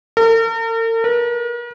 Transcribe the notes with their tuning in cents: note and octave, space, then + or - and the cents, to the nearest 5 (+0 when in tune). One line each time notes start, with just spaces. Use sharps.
A#4 -45
A#4 +40